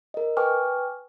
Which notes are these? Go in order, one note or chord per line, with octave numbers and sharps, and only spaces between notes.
A#4 D#5
B4 G5 G#5 C#6 D6 F6